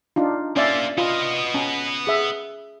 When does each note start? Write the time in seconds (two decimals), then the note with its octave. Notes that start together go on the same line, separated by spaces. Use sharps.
0.16 D4 D#4 F4
0.56 A#3 C#4 F4 D5 E5
0.98 B3 F4 D#5
1.54 C#4
2.07 G#4 E5